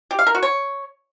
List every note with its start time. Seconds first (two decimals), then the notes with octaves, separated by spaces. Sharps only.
0.11 G4
0.19 F5
0.27 A#4
0.35 F#4
0.43 C#5